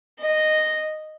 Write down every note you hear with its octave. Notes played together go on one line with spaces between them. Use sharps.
D#5